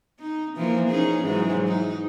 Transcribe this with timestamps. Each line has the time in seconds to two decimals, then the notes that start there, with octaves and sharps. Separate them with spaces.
0.20 D#4
0.56 E3 F3 A#3
0.90 C#4 D#4 G#4
1.23 G#2 E3 F#3
1.67 D#4